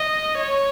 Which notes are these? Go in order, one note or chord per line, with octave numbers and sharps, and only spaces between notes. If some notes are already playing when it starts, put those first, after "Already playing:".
Already playing: D#5
C#5